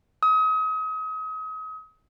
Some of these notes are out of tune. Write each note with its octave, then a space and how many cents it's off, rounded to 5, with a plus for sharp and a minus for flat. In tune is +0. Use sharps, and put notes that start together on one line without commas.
D#6 +35